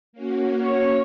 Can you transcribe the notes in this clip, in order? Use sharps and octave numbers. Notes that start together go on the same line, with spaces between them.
A#3 C#4 F#4
C#5